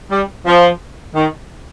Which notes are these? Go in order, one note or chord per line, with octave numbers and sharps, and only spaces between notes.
G3
F3
D#3